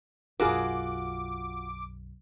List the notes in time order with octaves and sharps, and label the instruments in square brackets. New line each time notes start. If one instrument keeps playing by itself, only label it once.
[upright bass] B1 F#2 [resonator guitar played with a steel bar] F4 F#4 [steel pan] G#4 A#4 [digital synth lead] D6